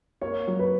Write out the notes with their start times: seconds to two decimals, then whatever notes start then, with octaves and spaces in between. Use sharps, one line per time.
0.21 A#3 C#5
0.48 F#3
0.59 B4